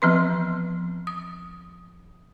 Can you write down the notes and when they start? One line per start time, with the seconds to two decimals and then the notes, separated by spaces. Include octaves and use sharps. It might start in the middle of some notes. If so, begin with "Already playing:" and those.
0.02 E3 F3 B3 C4 B4 C6
1.07 D#6